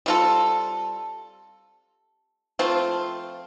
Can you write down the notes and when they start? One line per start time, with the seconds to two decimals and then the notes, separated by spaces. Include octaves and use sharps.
0.06 G3 C4 F4 A4
2.59 F3 A3 C4 F4